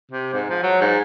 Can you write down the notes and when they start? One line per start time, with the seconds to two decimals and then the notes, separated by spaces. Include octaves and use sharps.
0.12 C3
0.33 G#2
0.50 F3
0.63 F#3
0.81 G#2